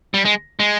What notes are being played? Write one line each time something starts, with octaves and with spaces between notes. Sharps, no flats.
G3
G#3
G#3